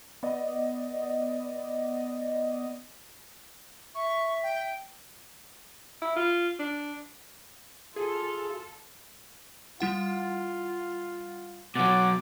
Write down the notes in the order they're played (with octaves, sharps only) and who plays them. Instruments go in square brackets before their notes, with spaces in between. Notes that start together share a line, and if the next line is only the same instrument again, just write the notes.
[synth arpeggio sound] B3 D5 D#5
[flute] E5 [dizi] C#6
[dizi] G5
[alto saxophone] E4
F4
D4
[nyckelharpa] F4 [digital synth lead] G#4 [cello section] A4
[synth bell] G3 E4 F#5 [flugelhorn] F4
[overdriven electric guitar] B2 F#3 [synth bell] C#5 A6 [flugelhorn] F#5 [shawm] D6